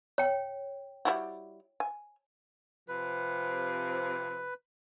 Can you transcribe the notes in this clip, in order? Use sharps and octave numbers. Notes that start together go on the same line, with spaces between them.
C#5 G5
G3 E4 F#4
G#5
C3 F3 B4